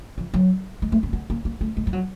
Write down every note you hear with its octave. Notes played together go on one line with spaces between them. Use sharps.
F3
F#3
G#3
A3
C4
B3
A#3
A#3
A3
G#3
G3
F#3